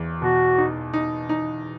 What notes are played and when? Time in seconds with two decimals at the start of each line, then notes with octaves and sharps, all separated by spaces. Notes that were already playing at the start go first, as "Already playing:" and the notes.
Already playing: E2
0.22 B2 F#4
0.58 D#4
0.94 D#4
1.29 D#4